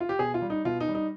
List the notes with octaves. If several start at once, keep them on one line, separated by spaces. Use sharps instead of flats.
F4
G4
B2 G#4
F4
G3
D#4
B2 F4
D#4
G3
D#4